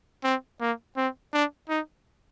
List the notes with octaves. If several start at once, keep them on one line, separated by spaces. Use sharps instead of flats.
C4
A#3
C4
D4
D#4